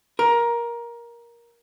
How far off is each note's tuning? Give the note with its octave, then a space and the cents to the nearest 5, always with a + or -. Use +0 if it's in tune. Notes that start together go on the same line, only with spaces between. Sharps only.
A#4 +15